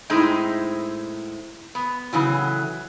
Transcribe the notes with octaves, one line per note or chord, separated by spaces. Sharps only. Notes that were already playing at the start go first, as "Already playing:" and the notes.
A2 G#3 C4 D#4 E4
B3
A2 C#3 E3 F#3